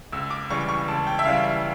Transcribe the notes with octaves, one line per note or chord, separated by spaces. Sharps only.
C#2 E6
D6
C#3 E3 G3 C#6
C#6
C#2 A5
G5
E5
C#3 E3 G3 F5
E5